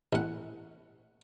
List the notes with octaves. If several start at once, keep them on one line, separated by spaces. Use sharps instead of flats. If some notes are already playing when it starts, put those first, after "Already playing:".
A1 F#5